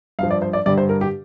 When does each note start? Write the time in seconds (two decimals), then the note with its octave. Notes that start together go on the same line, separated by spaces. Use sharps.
0.19 G2 F5
0.23 F3
0.31 D5
0.42 C5
0.53 D5
0.66 G2 D3 G3 D5
0.78 C5
0.89 A#4
1.01 G4